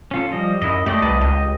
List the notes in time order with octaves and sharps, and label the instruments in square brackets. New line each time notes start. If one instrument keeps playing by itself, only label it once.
[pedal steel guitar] C#4 F4 A4
F3 G3 D#5
[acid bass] F#2 [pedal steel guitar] E4 D#5
[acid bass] A3 [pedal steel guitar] G4 D5 D#5
[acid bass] C2 [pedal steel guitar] B4 D#5 A5
[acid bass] C#2 [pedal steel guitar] G4 D#5